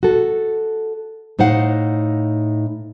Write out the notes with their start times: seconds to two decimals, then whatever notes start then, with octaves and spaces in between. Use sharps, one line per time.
0.03 F#4 A4
1.39 A2 D#4 C5 F5 F#5